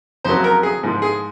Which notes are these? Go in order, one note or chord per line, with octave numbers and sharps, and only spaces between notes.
F2 C#3 F#3 C5
A#4
G#4
G#2 F3 G#3
G#4